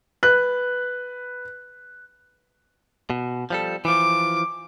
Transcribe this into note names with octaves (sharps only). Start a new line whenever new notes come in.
B4 F#6
B2
F3 G3 A4
E3 F3 D6